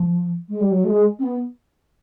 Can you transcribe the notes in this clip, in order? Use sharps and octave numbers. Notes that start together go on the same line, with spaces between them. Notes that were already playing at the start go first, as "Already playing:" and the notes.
Already playing: F3
G#3
G3
F#3
A3
G#3
C4
B3